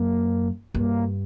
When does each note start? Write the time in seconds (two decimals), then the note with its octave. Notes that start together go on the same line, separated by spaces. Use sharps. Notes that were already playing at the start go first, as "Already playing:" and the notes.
Already playing: F#2 A#3
0.74 G2 A#3